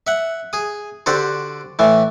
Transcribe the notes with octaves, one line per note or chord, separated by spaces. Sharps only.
E5 F#5
G#4 D#6
D3 F#4 G4 A4 C5
A2 E3 A3